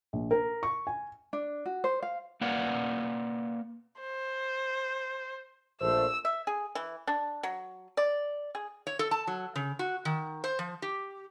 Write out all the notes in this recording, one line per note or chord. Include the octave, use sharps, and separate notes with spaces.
A#1
A#4
C#6
G#5
D4
F#4
C5
F5
A#3 B4 D5 F5 F#5
C5
A#1 A3 C5 E6
E5
G#4
E3
D4
F#3
D5
G#4
C#5
A4
A5
F#3
C#3
F#4
D#3
C5
F3
G4